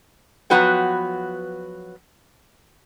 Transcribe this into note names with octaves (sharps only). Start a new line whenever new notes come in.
F3 F#3 B3 F#4 B4 G5